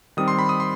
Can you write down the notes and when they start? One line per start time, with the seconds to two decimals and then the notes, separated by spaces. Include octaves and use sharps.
0.17 D#3 G3 C4 D#6
0.28 C6
0.39 B5
0.49 D#6
0.60 C6